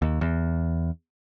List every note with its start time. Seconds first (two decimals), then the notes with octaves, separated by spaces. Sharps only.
0.02 D#2
0.21 E2